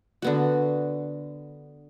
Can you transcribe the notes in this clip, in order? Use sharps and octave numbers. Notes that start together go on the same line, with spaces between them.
D3 B3 F#4